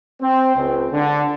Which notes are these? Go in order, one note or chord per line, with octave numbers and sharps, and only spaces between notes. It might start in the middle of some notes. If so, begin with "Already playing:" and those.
C4
C#2
D3